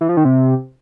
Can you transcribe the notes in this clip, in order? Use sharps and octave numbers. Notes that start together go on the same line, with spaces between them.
E3
F3
D#3
C3